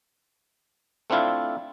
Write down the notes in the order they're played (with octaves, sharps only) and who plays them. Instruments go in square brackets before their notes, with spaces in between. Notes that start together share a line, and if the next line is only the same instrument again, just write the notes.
[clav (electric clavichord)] A3 C4 D4 E4 F4